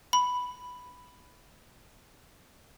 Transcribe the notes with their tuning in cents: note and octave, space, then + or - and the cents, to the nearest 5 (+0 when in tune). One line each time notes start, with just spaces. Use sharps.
B5 +0